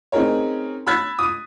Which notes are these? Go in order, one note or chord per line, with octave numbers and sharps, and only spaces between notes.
C4 C#4 D#4 G#4 A#4 C#5
B5 E6 F#6 G#6 A6 B6
D#6 D#7